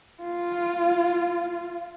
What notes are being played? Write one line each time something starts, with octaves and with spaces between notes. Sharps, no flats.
F4